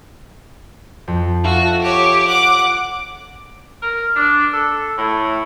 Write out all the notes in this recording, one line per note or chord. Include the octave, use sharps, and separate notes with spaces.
F2
F4 F#4 A4 E5
G4 C#5
F#5 D6
A#4
D4
A4
A2